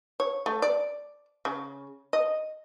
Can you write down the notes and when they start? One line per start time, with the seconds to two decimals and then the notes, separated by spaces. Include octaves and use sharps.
0.20 C#5
0.46 A3
0.62 D5
1.45 C#3
2.13 D#5